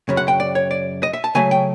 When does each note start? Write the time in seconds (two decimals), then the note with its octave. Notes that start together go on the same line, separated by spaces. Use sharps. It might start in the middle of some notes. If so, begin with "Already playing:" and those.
0.09 F#2 C#3
0.17 F#5
0.28 G5
0.40 D5
0.55 C#5
0.71 D5
1.03 D#5
1.13 E5
1.24 A5
1.35 C#3 F#3 A3 G#5
1.51 G5